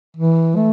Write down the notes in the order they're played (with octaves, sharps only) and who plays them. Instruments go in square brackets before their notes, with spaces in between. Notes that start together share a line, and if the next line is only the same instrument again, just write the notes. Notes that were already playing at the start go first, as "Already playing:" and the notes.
[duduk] E3
A3